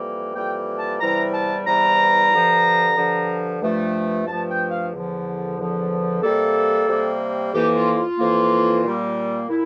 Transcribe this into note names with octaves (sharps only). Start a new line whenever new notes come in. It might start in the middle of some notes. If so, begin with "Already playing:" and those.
Already playing: F2 E3 G3 A#3
F2 E3 G3 A#3 G5
A5
E2 C3 E3 G3 A#5
A5
E2 C3 E3 G3 A#5
G2 D3 F3
G2 D3 F3
G2 F3 A3
G2 F3 A3 A5
G5
F5
E2 D3 F3
E2 D3 F3
C3 G3 A#3 A4
C3 G3 A#3
F2 E3 A#3 G4
F4
F4
F2 E3 A#3
A#2 G3 A#3
A#2 E4